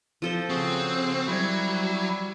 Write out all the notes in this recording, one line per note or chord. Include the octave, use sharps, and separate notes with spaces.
F3 A4 C5
C#3 C4 F#4 G#4
F#3 G3 E4